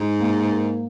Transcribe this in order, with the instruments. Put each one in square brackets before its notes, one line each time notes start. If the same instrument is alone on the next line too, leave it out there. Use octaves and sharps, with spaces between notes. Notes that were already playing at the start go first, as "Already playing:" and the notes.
Already playing: [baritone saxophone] G#2
[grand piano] A#3
A#4